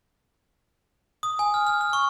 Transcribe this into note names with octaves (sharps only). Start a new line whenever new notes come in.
D#6
G#5
F6
F6
F6
C#6